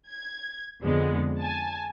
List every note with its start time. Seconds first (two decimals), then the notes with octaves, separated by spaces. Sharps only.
0.11 G#6
0.81 F2 D3 G#3 B3
1.40 G#5 A5